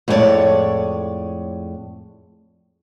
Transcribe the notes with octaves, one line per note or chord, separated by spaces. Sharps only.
F2 A2 G#3 B3 C#5 D5